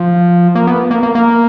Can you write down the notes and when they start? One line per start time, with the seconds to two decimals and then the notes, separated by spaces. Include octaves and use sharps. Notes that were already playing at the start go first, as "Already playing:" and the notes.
Already playing: F3
0.55 A#3
0.67 B3
0.91 A#3
1.03 A#3
1.15 A#3